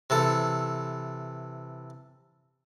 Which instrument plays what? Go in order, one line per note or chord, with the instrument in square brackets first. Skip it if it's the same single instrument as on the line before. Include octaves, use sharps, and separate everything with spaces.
[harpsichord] C3 E3 A4